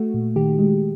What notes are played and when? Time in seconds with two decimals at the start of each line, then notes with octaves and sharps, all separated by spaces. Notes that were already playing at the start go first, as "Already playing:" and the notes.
Already playing: A3 F#4
0.14 A#2
0.36 D#3 G4
0.59 G#3